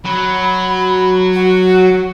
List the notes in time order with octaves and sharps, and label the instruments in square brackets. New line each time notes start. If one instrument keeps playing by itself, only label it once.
[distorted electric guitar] F#3 [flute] B5
[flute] F#4